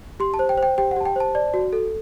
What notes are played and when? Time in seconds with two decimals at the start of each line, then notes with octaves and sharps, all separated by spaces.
0.20 G4 C6
0.34 A5
0.39 C5
0.49 G5
0.58 C5
0.63 G5
0.78 G4 G5
0.91 F#5
0.96 G4 A5
1.05 G5
1.16 C5 A5
1.35 D5
1.54 F#4
1.73 A4